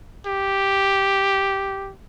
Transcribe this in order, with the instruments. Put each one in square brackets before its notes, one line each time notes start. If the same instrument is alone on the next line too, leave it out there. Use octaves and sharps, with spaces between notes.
[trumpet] G4